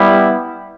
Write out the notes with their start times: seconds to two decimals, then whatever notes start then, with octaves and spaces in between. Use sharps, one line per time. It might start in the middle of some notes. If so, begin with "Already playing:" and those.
Already playing: G3 B3 E4